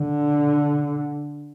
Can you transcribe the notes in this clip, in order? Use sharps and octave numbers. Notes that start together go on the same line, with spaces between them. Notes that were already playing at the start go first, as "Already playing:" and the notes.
Already playing: D3